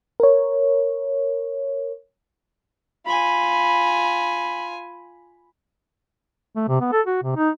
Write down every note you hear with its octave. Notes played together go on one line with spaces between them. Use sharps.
A#4 C#5
F4 G#5 B5
A3
C3
B3
A4
F#4
C3
D#4